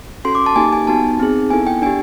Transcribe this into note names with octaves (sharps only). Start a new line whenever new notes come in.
C#4 F#4 A4 C6
D6
A5
A#3 D#4 G4 G#5
G#5
B3 D#4 F#4 A5
C4 D#4 G#4
B3 E4 A4 G#5
G5
D4 G4 G#5